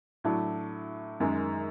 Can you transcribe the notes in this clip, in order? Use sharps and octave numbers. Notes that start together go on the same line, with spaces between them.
A2 F#3 A3 D4
F#2 D#3 G#3